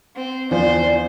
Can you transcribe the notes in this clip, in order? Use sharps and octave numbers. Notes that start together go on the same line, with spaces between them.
C4
E2 F3 C5 D5